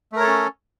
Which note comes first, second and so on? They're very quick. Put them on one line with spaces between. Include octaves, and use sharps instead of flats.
A3 A#4 C#5 A4 C#4